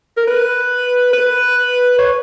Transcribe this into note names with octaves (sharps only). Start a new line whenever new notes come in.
A#4
B4
B4
C#5